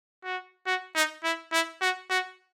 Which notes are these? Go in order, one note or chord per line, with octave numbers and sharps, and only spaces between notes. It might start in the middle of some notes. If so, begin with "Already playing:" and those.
F#4
F#4
D#4
E4
E4
F#4
F#4